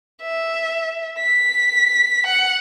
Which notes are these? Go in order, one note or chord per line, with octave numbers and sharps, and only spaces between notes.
E5
B6
F#5